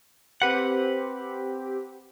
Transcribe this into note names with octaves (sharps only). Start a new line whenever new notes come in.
C4 G4 B4 F#5